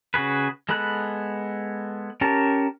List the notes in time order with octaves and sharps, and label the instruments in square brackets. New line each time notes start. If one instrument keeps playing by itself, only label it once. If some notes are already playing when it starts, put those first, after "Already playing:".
[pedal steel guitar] C#3 F#4 G#4 B4
G#3 B3 A4 B5 F#6
C#4 G4 A#4 A5 A#5